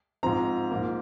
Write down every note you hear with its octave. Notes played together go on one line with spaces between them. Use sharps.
G#2 F3 C4 A#5
G#2 F3 A#3